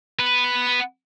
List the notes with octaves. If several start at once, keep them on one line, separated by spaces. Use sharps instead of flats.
B3 B4